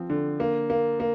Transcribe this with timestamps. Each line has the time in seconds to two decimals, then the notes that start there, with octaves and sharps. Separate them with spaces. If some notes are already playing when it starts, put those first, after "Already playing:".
Already playing: F3 C4
0.10 D3
0.40 A#3
0.70 A#3
1.00 A#3